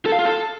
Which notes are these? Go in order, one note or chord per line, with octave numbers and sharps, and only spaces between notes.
A4
F5
F4
A4